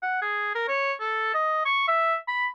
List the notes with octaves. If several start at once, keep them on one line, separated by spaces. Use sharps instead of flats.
F#5
G#4
A#4
C#5
A4
D#5
C#6
E5
B5